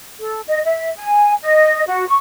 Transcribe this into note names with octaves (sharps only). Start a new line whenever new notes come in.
A4
D#5
E5
G#5
D#5
F#4
C#6